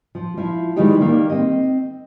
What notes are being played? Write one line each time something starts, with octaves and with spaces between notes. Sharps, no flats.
F3
F3 E4
D#3 E3 G3 G#3 D#4 G4
D#3 G3 A#3
C4 D#5